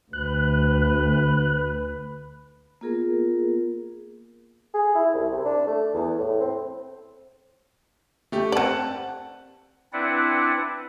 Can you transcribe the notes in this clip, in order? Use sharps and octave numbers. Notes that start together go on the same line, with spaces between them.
D2 B4 F#6
A#3 B3 F4 G#4 A#4
G#4
E4
C2
C3
D4
A3
E2
A2
C4
A3 G4
C4 D5 F#5 A5 F#7
C4 D4 E4 B4 D5 F#5